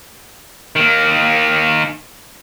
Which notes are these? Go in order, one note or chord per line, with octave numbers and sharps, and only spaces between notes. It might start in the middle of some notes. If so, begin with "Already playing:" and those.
D#3 A#3